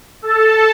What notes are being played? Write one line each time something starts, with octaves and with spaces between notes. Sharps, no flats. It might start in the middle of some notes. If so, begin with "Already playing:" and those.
A4 A5